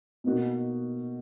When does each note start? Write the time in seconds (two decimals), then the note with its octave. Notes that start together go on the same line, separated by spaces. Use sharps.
0.24 B2 A#3 D#4 F#4